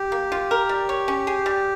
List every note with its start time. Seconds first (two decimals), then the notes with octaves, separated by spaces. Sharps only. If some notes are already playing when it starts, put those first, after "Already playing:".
Already playing: G4
0.12 A#3
0.32 F4
0.51 A#4
0.69 G3
0.89 C#5
1.08 C#4
1.27 G#4
1.46 G3